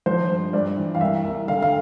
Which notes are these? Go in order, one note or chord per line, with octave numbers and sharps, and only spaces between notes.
F3 C5
G2
G2 D5
E3
F5
C2 E5
C2
D3 F5
F5